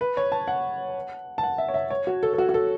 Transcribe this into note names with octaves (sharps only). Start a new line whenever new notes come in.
B4
C#5
A5
F#5
A5
F#5
E5
C#5
E5
C#5
F#4
A4
A4
F#4
F#4
A4